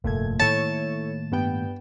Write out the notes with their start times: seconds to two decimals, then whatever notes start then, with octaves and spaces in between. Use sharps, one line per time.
0.04 F1 G2 A#2 A3 G#6
0.40 A2 D#3 A#3 E4 A4 C#5 A5
1.32 G2 B3 G5